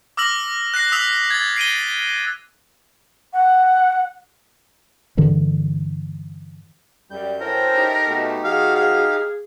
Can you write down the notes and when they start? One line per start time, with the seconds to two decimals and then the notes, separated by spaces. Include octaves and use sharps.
0.17 D6 E6 F6 A#6 F#7
0.74 F#6 A#6 C7
0.92 D#6 E6 B6 F7
1.30 G#6 A6
1.56 C7 D7 D#7 G7
3.33 F#5
5.17 G2 D3 E3 G3
7.11 F#2 G3 G6
7.41 C#4 E4 A4 A#4 C5 G5
7.77 D#4 G4
8.08 B2 A3
8.44 F3 F#4 G#4 F5
8.75 F5